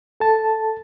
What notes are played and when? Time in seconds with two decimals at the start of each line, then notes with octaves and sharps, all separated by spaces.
0.20 A4 A5